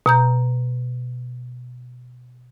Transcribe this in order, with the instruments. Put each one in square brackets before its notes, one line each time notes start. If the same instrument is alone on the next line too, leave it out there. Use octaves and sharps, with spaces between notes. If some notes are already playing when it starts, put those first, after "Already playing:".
[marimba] B2 A#5 G6